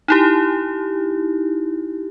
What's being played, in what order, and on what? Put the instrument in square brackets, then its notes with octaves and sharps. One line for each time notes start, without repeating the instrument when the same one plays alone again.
[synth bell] D#4 E4 G4